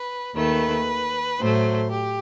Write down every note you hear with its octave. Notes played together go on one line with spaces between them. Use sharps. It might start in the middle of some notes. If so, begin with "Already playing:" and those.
Already playing: B4
D#2 D#3 A3 B4
A2 F#3 A3 C5
G4